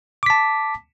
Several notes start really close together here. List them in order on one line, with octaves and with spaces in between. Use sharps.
D6 B6 A5